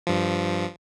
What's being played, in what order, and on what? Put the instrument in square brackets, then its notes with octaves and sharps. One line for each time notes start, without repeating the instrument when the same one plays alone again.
[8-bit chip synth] G2 F3